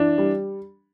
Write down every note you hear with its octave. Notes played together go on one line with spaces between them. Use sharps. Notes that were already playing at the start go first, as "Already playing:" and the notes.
Already playing: E3 D4
G3